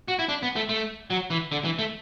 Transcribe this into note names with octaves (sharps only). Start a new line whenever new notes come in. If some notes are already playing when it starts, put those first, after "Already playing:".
F#4
E4
D4
B3
A3
A3
F#3
E3
D3
E3
A3